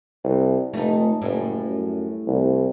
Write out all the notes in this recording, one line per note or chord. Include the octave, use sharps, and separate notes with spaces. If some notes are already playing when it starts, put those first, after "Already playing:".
C2
F1 A3 D#4
F#1 A2 G3
F#2
C2